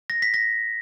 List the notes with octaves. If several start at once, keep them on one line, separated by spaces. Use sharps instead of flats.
A#6
B6
A#6